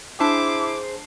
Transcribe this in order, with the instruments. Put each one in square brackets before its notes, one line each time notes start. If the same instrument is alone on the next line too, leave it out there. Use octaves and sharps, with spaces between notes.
[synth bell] D4 A5 C7 [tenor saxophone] E4 [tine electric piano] G#4 C5 [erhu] D6